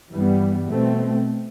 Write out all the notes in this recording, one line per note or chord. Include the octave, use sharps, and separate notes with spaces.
G2 E3 G3 B3
B2 A3 C4